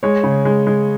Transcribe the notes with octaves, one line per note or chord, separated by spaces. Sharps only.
G#3 C#5
C#3
G#3
G#3